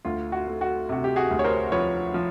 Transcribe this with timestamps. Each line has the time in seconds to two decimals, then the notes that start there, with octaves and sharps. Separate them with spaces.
0.05 D2 F4
0.32 F#4
0.47 A3
0.61 F#4
0.89 C3 F#4
1.04 G4
1.16 F#4 G#4
1.31 D2
1.39 C#5
1.44 A#4 C5
1.72 F3 B4 C#5
2.14 F3